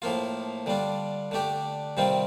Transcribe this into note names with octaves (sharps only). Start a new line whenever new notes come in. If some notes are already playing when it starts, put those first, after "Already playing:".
A2 F3 A#3 F4
D3 G3 D4 F4
D3 A3 D4 G4
C3 D#3 G3 C4 F4